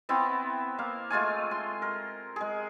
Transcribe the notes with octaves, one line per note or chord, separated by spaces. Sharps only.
B3 C4 E4
A#3 F5
G#3 A3 F4 G#5
C6
A#4
G#3 G#4